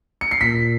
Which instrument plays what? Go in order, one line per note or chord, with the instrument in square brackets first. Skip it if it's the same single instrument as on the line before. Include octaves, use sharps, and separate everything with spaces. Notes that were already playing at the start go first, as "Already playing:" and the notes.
[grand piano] C#7
C7
[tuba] A#2 [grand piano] B6